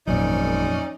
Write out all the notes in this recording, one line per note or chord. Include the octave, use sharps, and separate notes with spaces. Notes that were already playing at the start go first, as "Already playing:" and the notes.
G#1 F2 A#2 F#3 C#4 D#4 D5